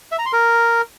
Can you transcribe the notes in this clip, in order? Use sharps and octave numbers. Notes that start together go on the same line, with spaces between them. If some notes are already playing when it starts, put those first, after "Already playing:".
E5
A#5
C6
A#4